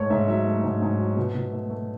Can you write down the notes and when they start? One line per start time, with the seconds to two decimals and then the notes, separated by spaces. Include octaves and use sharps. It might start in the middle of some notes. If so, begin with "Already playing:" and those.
Already playing: G#2 A3 C#5
0.10 G#2 E5
0.28 F#3 E5
0.46 A3
0.64 G#2
0.82 G#2
0.99 F#3
1.16 B2
1.34 B2
1.53 A3
1.70 A3